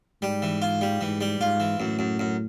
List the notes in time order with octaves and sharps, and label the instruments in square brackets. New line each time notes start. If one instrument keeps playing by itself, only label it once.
[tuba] G#2 [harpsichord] G3
[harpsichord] E3
F4
G3
[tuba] G#2 [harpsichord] E3
[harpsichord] G3
[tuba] G#2 [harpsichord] F4
[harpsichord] E3
[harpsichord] F#2 [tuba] A2
[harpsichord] F#2
F#2